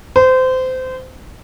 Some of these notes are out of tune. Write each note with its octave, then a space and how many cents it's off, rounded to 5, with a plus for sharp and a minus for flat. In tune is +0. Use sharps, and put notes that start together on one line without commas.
C5 -25